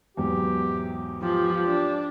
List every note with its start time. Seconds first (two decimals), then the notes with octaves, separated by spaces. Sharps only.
0.17 E2 G#2 F#3 G4
1.22 F3 G4
1.67 D4